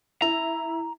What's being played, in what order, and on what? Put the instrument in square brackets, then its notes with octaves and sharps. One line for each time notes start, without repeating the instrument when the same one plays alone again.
[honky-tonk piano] E4 [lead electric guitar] A#5